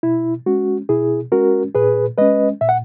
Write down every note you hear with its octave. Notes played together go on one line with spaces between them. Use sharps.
B2 E4
G#3 C#4 F#4
B2 E4 G#4
G#3 C#4 F#4 A#4
A#2 G#4 B4
G#3 C#4 B4 D#5
A#2 E5
F#5